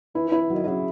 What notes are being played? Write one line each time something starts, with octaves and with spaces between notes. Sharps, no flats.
E3 E4
E3 E4
E3
D#3 F#3
D#3
C#3 F#3